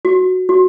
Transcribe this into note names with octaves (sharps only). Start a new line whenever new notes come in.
F#4
F#4